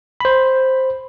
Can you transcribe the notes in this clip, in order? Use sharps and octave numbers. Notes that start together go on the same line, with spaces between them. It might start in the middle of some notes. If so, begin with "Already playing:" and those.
C5 B5